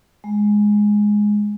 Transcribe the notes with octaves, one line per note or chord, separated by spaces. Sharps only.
G#3